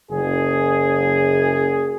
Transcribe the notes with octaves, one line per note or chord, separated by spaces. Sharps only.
F#1 G#4